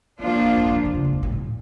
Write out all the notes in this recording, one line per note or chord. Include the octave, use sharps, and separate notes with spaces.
G#2 F3 A#3 D4 F4
G#2
G2
G2
A2
A#2
B2
C#3
G#2
G2
A2
A#2